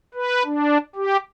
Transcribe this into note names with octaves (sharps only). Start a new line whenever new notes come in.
B4
D4
G4